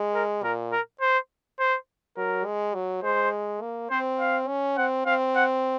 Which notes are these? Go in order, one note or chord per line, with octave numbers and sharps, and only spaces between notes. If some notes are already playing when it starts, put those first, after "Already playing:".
Already playing: G#3
A#4
A#2 A#4
A#4
C5
C5
F#3 A#4
G#3
F#3
G#3 C5
A#3
C4 C5
F5
C#4
C4 F#5
C4 F5
F#5